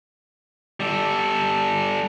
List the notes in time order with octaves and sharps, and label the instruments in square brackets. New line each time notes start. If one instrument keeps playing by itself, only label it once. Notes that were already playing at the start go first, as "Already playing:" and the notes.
[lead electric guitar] G3 A4